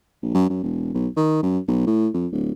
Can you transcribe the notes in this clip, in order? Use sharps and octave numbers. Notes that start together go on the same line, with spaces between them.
A#1
F#2
F#2
E1
B1
D#3
F#2
B1
A2
F2
D1